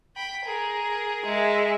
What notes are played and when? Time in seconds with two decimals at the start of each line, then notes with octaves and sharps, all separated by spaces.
0.16 G5 B5
0.45 G#4 A#4
1.25 G#3 E5